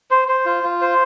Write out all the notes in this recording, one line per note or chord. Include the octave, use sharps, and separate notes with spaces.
C5
C5
F4
F4
C5